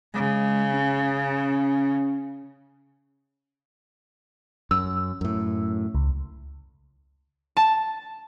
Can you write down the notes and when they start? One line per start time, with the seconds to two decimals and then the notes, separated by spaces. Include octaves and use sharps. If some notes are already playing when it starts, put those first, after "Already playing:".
0.14 C#3 G#3
0.73 C#4
4.71 F#2 E6
5.21 F#2 A2
5.95 C#2
7.57 A5